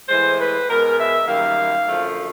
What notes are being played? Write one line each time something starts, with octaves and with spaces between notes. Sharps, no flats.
A2 E3 G#3 C5
B4
B2 G#3 A#4
E5
F#2 D#3 G3 A#3 F5
F#2 D3 F3 A3